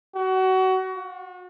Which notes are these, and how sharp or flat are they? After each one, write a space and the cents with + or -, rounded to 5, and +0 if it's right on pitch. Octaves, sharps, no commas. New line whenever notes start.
F#4 +25
F#4 -40